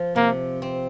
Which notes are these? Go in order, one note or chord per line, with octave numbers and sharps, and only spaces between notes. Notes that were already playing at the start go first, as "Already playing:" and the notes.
Already playing: F3
C3 A#3
C4